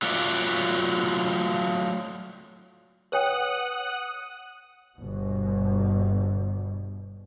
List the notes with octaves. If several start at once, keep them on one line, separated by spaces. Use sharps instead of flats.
F#3 A3 F4 C#5 D5 E5
B4 C#5 F#5 G5 D#6 F#6
G1 B2